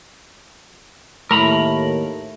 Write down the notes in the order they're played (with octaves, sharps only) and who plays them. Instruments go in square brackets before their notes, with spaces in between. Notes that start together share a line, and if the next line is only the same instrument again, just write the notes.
[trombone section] D#2 A2 [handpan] A3 [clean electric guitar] A#4 A#5 B5